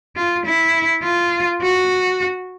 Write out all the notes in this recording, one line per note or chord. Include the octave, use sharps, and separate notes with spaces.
F4
E4
F4
F#4